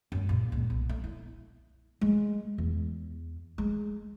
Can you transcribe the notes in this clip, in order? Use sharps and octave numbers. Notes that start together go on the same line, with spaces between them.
F#2 G#3
A#2 C#3
C#2
B1
A3
E4
G#3
E2
G#3